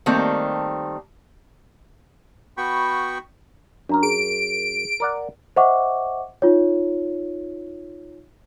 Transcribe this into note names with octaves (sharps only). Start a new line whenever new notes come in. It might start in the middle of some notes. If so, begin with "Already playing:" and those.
D#3 G3 A3 A#3 C4
B3 F#4 G5 B5 C#6
F#2 D4 A#4 A#5
G#4 D7
A#4 D5 F#5
C5 D#5 E5 F#5 C#6 D6
D#4 F4 C#5